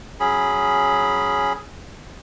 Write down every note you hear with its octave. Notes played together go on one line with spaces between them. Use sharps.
F#3 C#4 G#4 B5